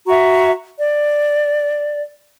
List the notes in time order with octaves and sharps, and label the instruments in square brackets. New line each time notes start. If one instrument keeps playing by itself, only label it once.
[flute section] F#4 E5 A#5 C#6
D5